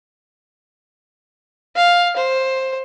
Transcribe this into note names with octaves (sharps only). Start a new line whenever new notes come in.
F5
C5